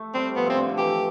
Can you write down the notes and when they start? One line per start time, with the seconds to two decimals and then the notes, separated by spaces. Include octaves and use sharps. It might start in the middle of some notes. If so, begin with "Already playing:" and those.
Already playing: A3
0.14 G3 C4
0.36 F3 B3
0.46 C3 C4
0.57 D3
0.69 D3
0.78 E3 G4